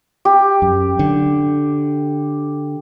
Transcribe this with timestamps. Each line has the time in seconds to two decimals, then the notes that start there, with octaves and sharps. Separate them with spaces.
0.25 G4
0.62 F#2
0.99 D3